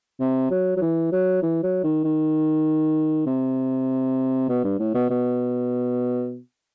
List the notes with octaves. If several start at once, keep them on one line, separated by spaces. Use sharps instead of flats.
C3
F#3
F#3
E3
F#3
E3
F#3
D#3
D#3
C3
B2
G2
A2
B2
B2